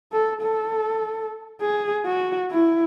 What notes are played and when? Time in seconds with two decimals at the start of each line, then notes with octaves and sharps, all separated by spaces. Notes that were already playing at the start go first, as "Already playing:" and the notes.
0.12 A4
0.42 A4
1.61 G#4
2.06 F#4
2.50 E4